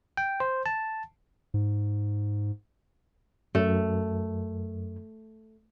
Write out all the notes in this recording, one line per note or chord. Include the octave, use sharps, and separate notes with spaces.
G5
C5
A5
G#2
F#2 A3